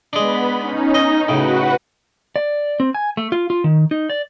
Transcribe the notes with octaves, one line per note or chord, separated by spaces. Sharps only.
G#3 B3 D4 B5
C#4 D#4
D#4 D#5
A2 C#3 F#4 B4 F#5
D5
C4
G#5
A3
F4
F4
D#3
D#4
D5